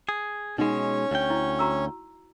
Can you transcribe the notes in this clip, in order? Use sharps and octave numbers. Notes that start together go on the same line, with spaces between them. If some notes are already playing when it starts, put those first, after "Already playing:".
G#4
B2 G#3 C#4 D#4 C#5
D2 G5
E4
F#4 A#5 E6